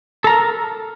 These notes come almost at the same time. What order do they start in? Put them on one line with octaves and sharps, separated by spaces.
A4 A#5 A#4